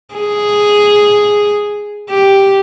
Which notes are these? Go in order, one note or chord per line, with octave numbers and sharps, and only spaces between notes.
G#4
G4